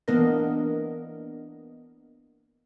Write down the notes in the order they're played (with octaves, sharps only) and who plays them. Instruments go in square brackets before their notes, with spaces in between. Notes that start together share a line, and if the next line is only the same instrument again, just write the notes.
[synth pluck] E3 A#3 B3 D4 A#4 D#5